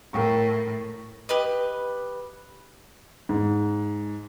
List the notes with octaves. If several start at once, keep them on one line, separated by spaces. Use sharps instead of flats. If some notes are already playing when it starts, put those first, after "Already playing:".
A2 A#4 G5 C#6
G4 B4 D#5
G#2